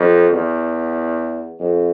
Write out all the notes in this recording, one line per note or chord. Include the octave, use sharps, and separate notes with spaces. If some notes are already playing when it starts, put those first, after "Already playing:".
Already playing: F2
E2
F2